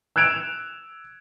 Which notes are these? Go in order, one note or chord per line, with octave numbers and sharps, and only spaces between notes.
E6 F#6 G#6 D7 E7 F7